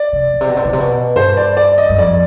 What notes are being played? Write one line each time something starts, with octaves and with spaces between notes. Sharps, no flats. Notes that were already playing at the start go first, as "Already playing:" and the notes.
Already playing: D5
C3
B2
C3
B2
C3
B2
C3
B2
G2 C5
D5
D5
D#5
G2
F2 D5